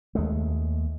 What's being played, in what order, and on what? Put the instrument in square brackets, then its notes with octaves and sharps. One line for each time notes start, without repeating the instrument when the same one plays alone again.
[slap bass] D#2 G#3 A3